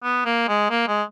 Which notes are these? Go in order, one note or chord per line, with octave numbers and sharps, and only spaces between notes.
B3
A#3
G#3
A#3
G#3